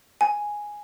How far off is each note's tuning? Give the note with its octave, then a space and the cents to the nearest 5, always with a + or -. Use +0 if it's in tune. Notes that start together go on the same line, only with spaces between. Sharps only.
G#5 +0